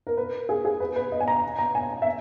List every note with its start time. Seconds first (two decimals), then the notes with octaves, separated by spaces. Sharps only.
0.07 A#4
0.17 B4
0.49 G#4
0.65 G#4
0.80 B4
0.96 B4
1.12 D#5
1.20 G#5
1.28 A#5
1.59 A#5
1.75 G#5
2.02 E5